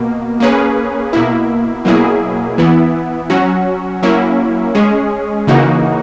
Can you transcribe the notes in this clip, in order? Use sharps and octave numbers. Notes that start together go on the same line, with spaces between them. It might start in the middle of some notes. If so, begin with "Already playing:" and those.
Already playing: B2 A#3
A#3 C#4 G#4 B4
B2 A#3 E4
B2 F#3 A#3 E4 G#4
E3 B3 E4
F#3 C#4 F#4
F#3 A#3 C#4 E4
G#3 C#4 G#4
C#3 E3 A#3 D#4 F#4